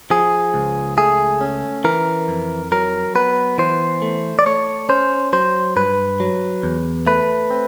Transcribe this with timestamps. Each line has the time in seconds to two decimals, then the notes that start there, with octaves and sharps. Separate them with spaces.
0.10 F3 G#4
0.54 C#2
0.97 A3 G#4
1.41 C#4
1.84 E3 A#4
2.28 F2
2.72 F#3 A#4
3.15 B3 B4
3.58 E3 C5
4.02 A3
4.39 D5
4.46 A3 C#5
4.89 C#4 C5
5.33 F#3 C5
5.76 G2 B4
6.20 F#3
6.63 E2
7.07 A3 B4
7.51 C4